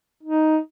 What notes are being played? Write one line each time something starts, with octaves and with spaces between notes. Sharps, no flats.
D#4